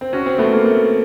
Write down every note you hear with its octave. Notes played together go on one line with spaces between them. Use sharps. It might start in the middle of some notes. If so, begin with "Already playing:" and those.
C4
C#4 F#4
C4
A3 B3
A#3
A3